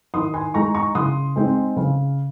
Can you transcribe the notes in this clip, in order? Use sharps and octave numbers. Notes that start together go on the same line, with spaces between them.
D#3 C6 D#6
G#5 C6
G#3 D#4 A#5 C#6
A#5 C#6
C#3 C6 D#6
G#3 C4 D#4
C#3